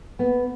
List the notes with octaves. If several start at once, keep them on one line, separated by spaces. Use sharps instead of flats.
B3